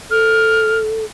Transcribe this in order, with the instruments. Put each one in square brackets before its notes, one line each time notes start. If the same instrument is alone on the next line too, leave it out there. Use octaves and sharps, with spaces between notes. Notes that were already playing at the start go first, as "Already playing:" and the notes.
[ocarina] A4 [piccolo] F6